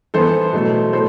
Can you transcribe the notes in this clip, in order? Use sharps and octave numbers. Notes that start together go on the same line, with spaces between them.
E3 B3 A4 C5
B2 F#3 A3
A2 A4 C5